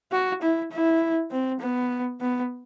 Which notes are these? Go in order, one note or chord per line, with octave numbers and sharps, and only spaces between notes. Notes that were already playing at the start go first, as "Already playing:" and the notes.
F#4
E4
E4
C4
B3
B3